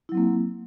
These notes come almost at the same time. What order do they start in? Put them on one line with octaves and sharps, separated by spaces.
E4 F#3 C4 A#3